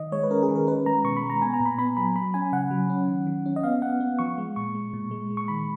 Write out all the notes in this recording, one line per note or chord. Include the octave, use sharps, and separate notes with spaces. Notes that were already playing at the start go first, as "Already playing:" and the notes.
Already playing: D#3 D#5
G#3 C#5
B4
C#4 A#4
G#4
D#3
A#4
C#4 B4
G#3 A#5
B2 C#6
B5
G#3
A#5
B3 G#5
A#5
A#2
B5
B3 B5
F#3 B5
F#3 B5
C#4 G#5
C#3 F#5
F#3
C#4
D#3
D#3
C#4
D#5
B3 F5
B3 F#5
B3
F3 C#6
G#3
A#2 C#6
G#3
A#2
G#3
G#3
C#6
D#3 B5